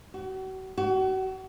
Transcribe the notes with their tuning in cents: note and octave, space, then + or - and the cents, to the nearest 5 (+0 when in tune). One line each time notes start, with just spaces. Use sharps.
F#4 +40
F#4 +35